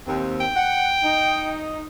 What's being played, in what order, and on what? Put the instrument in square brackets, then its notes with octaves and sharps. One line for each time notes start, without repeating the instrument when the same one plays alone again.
[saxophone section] D#2 C4
[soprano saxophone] G5
[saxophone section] F#5
D#4